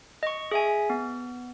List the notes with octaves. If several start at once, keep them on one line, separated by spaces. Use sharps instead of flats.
D#5 C#6
G#4 E5 G#5
B3